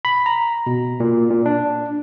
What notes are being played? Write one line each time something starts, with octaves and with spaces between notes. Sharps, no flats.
B5
A#5
B2
A#2
A#2
D4